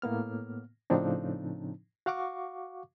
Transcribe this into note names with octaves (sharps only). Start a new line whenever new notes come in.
A2 A#3 B3 F6
A2 C#3 F3 C4 D4 D#4
F#4 F5 F#5 C#6 D6